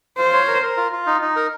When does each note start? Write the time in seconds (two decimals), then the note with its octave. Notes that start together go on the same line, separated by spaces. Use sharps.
0.18 F4 C5
0.33 C#5
0.47 A#4
0.63 A#4
0.77 F4
0.92 F4
1.06 D#4
1.22 D#4
1.36 A#4